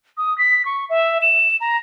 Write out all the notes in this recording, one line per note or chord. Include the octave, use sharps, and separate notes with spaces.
D#6
B6
C#6
E5
E7
A#5